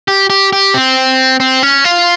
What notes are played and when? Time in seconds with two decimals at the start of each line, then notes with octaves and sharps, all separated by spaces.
0.08 G4
0.30 G4
0.53 G4
0.74 C4
1.40 C4
1.63 C#4
1.84 F4